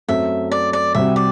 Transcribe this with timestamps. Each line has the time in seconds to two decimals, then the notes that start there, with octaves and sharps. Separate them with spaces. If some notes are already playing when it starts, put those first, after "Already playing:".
0.08 F#2 F#3 A3 C4 E5
0.52 D5
0.73 D5
0.94 C2 C3 G3 C4 F#4 E5
1.16 D5